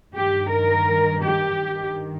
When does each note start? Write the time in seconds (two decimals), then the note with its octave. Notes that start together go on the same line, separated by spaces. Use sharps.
0.13 G2 D#3 G4
0.50 A#4
1.22 G4
1.58 G2 D#3